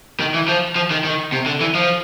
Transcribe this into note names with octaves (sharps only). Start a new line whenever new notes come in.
D#3
E3
F3
F3
D#3
D#3
C3
D3
E3
F3